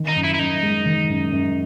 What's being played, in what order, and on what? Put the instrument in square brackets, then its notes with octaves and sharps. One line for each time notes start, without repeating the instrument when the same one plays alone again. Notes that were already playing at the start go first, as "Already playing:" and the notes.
Already playing: [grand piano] D#3
[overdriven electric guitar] D#4
[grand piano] F#2
[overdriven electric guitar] E4
E4
[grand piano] F#2 [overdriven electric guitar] D#4
[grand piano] G#3
D#3
F#2
F#2